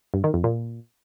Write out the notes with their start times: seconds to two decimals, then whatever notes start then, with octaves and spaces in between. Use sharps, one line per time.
0.14 G2
0.24 D#3
0.34 F2
0.44 A#2